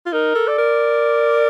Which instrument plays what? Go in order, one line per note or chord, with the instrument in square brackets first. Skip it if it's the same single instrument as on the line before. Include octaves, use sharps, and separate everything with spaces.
[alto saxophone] F4
[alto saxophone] D#4 [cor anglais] A#4
[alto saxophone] A4
[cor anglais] D5
[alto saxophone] A#4